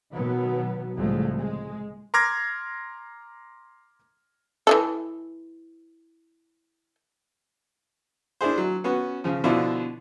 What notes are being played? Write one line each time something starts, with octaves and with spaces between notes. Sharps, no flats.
B2 D#3 F#3 B3
C2 A2 C#3 F3 G#3 A3
G#3
A#5 C6 D6 F6 G#6 A#6
E3 G#3 A4
D4 E4 G#4 C5
F#3
B3 C#4 F#4
C#3 F3
B2 D3 F3 D4 E4 F4